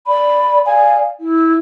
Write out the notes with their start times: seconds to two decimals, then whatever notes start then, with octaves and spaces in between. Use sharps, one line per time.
0.08 D5 B5
0.66 D5 F5 G#5
1.20 E4